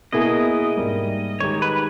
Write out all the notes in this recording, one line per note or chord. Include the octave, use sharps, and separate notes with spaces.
B2 A#3 E4 G#4 D#5
G#2 G3 A#3
D#3 G#3 D#4 G4 C#5
B4